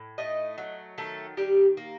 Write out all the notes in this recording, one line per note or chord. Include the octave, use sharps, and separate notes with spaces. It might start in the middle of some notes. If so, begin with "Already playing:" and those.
Already playing: A2
A3 D#4 D#5
F#3
D#3 A3 A4
D#3 G3 G4
A#3